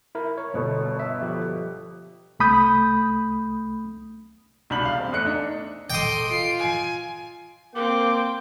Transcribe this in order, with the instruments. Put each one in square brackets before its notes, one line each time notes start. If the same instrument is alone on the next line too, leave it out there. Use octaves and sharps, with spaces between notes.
[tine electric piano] E4 A#4
C#5
[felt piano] G1 B2 A4
[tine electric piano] E5
F3 G4
[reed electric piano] C2 A3 B5 D#6 G6
[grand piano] C2 B2 D4 B5 G6 F#7
E1 F5 G6
C4
E2 A3 F#6 C#7
D4 D#4
[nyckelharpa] A4 D#5 [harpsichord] G5 D#6 [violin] C6 D6
[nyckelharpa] F4 [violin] C7 D7
[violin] G#5
[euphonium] A#3 [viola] C4 [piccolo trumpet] G5 [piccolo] D6